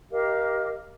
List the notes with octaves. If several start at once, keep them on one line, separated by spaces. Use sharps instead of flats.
G4 A#4 D#5 F5